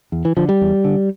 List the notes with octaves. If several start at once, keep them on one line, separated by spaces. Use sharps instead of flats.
E2
E3
D3 F3
G3
E2
D3